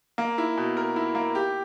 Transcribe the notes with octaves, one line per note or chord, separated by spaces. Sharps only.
A#3
E4
B2
A#4
E4
A#3
G4